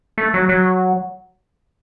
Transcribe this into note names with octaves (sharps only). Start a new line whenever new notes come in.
A3
F#3
F#3